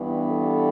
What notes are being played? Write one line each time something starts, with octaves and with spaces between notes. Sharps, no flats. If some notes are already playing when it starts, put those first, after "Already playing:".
Already playing: G2 E3 B3
A4